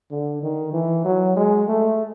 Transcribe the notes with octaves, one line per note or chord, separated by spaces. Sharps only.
D3
D#3
E3
F#3
G#3
A3